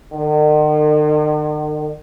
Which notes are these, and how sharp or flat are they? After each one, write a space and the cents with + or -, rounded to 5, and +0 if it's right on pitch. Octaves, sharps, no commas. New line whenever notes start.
D#3 -45